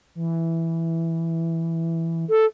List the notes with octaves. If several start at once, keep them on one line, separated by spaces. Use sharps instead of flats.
E3
A4